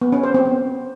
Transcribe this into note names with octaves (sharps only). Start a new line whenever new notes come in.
B3
C#4
C5
C4
B3